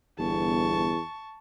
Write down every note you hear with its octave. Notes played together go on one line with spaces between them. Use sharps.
G1 E2 A5 C#6